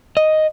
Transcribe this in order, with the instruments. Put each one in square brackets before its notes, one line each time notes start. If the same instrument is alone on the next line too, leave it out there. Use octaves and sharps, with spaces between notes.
[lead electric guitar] D#5